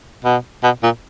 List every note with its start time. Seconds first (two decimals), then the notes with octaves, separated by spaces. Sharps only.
0.24 B2
0.63 B2
0.83 A#2